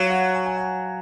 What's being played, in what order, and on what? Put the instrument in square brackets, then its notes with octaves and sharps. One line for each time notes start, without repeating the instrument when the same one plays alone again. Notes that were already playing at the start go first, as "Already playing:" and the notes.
Already playing: [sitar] F#3 [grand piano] F5
[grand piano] F#5
G#5
G#5
F#5